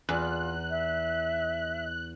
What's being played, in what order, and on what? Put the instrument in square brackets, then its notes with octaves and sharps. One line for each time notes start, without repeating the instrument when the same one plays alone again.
[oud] E2 [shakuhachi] F4 [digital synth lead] F#6
[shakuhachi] E5